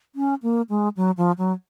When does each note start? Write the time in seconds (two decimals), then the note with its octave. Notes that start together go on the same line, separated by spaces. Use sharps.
0.15 C#4
0.43 A#3
0.70 G#3
0.97 F#3
1.17 F3
1.38 F#3